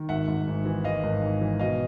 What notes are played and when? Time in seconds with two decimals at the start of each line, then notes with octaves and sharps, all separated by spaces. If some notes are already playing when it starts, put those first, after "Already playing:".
Already playing: D#3
0.09 G#1 E5 F#5
0.28 G#1
0.48 G#2
0.65 E3
0.84 G#1 D#5 F5
1.03 G#1
1.22 G#2
1.41 E3
1.59 B2 D#5 F5